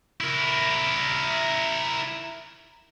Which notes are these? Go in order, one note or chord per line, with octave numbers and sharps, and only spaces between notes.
E4 A#4